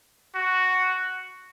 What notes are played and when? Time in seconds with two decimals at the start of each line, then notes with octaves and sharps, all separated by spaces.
0.35 F#4